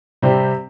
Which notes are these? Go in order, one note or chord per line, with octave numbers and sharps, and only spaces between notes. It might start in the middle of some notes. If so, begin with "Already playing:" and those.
C3 G3 C4 G4